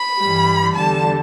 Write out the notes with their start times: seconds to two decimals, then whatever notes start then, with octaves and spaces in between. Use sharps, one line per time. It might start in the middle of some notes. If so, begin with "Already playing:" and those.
Already playing: B5
0.19 G2 E3 G3
0.75 E2 D3 G3 A5